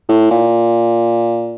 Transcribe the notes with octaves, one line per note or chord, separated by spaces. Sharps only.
A2
A#2